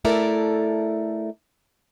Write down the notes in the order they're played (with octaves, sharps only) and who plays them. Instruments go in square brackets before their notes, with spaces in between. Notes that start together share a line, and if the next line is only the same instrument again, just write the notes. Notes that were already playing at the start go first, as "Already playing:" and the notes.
[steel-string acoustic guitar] A3 E4 A4 A#4 D5